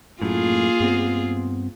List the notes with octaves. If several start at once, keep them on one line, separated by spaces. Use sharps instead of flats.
F#2 A2 A#3 F4 G#4
G2 B3 C4